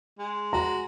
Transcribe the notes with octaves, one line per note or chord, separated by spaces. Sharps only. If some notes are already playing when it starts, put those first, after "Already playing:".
G#3
F#4 A#5